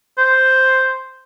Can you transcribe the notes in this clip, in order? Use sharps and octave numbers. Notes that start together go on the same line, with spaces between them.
C5